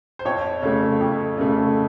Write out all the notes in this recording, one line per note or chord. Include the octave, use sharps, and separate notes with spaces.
C5
F2 C#5
C#3 A3
F2
C#3 A3